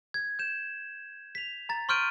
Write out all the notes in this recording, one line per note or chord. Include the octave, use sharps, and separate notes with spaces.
G#6
G6 E7
B6 F7
A#5 A6
C6 C#6 F6 G6 D7 D#7